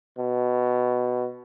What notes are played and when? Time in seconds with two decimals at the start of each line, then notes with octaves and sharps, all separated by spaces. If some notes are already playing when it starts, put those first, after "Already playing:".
0.18 B2